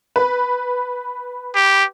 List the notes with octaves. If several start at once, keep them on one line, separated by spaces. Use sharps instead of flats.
B4
G4